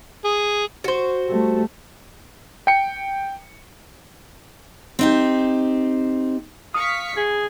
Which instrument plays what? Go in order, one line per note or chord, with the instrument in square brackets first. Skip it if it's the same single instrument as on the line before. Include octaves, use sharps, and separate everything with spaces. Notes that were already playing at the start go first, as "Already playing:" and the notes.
[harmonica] G#4
[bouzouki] F#4 C5
[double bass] G3 A3
[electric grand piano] G5 C#7
[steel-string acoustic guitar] C4 D#4 G4
[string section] F5 C#6 B6 [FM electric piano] D#6
[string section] C#3 [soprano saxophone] G#4